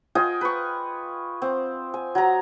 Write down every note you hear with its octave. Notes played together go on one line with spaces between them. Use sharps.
F4 D#5 G5 G#5
B4 C#6
C4
G#5
F#3 A#5